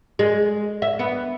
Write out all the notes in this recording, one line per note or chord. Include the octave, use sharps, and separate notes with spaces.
G#3
E5
B3